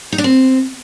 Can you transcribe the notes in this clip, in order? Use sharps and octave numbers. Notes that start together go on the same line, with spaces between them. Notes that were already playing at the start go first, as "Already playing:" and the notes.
D#4
D4
C4